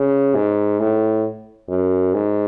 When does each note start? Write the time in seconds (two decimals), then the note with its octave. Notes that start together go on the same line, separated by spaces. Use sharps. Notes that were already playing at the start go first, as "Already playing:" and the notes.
Already playing: C#3
0.35 G#2
0.80 A2
1.69 F#2
2.14 G#2